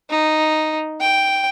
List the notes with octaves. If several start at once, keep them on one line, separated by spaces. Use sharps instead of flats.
D#4
G5